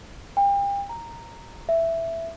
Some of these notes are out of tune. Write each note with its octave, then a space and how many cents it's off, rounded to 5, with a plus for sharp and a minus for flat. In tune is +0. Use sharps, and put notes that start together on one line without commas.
G5 +35
A#5 -10
E5 +5